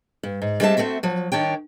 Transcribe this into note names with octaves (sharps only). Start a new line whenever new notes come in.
G2
G#2
G3 G#3 C4 E5 F#5 A5
A3 A#3 C4 F#4 E5
F3 F#3
D#3 D4 C#5 G5